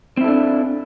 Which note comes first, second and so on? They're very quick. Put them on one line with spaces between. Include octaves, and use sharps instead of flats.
C4 E4 A4 D4